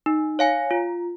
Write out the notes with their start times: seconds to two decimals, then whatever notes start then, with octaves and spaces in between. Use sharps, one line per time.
0.06 D#4
0.39 C#5 F5 G#5
0.71 F4